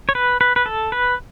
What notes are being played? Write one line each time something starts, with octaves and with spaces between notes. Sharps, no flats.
C#5
B4
B4
B4
A4
B4